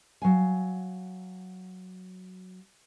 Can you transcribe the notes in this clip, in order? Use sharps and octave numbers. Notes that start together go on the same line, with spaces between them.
F#3 F5 G#5